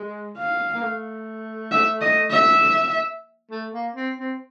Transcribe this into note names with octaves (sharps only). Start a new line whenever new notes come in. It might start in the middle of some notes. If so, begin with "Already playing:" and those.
Already playing: G#3
F5
A#3
A3
E5
D#5
E5
A3
A#3
C4
C4